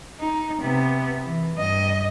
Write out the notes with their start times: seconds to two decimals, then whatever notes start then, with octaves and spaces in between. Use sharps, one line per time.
0.20 D#4
0.60 C3 B3
1.26 E3
1.57 G2 D#5